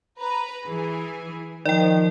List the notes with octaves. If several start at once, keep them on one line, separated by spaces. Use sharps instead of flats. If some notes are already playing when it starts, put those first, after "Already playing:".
B4 A#5
E3 G#4
D#3 F3 D5 G5